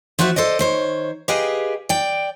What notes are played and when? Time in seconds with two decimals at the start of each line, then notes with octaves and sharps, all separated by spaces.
0.19 F3 F4 F#4 C5 E5
0.36 A4 C5 D5 D#5
0.59 D#3 C5 C#5
1.28 G4 G#4 B4 D#5 F5 G5
1.89 D5 G5